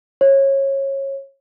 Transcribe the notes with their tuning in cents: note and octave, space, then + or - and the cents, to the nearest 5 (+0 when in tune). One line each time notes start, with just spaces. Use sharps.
C#5 -25